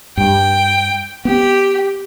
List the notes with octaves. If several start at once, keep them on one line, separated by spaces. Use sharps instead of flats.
G2 G5
B3 G4